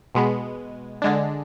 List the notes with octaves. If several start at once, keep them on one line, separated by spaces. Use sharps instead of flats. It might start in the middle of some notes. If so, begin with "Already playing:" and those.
B2 G#3 B3
D3 G#3 D4